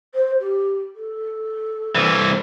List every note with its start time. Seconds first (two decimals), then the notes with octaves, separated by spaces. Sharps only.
0.15 C5
0.40 G4
0.95 A4
1.95 C2 E3